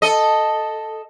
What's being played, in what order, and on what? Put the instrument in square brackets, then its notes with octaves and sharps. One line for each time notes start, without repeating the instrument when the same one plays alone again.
[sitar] A4 D#5